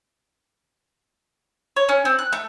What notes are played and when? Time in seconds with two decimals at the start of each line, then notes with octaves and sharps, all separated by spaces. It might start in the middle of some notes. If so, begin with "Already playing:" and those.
1.76 C#5
1.89 C#4
2.05 C4
2.19 F#6
2.33 A3